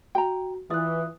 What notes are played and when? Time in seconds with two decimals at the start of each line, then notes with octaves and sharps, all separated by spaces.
0.15 F#4 G5 A#5
0.70 E3 F4 D5 D#6 F#6